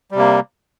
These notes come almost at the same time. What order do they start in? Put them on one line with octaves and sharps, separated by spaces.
G3 C3 A#3